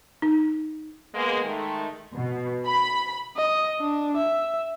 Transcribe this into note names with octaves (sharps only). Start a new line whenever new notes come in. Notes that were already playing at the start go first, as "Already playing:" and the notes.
D#4
G#3 A#3 B3
D#3 G#3 A3
B2
B5
D#5
D4
E5